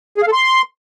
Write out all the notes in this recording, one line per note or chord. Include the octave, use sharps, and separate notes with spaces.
G#4
F5
A4
C6